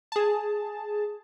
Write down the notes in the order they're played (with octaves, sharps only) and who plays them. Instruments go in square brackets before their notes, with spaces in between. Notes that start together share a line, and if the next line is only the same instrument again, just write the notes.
[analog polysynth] G#4 A5